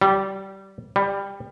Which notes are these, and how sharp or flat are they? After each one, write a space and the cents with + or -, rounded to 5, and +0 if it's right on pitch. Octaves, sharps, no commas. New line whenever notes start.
G3 -20
G3 +15